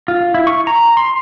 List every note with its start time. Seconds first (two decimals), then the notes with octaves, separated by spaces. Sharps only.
0.08 F4
0.34 E4
0.47 C#6
0.67 A#5
0.97 C6